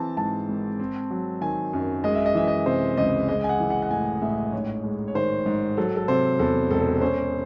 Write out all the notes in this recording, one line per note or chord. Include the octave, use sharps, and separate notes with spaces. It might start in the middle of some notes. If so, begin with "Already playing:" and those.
Already playing: E3 C4 A5
G#2 A5
G#1
C4
F#3
D#3 G#5
F#2
G#3 D#5
E5
D#5
E3 E5
D#5
C3 C5
C#2 D#5
G#3 D#5
G#5
F#5
E3
F#5
F#5
A2 G#5
A1 E5
G#2 C#5
G#3
C#5
D#3 C5
G#2
F#3 A4
A4
C3 C5
E2 A4
E1 A4
C#4 C5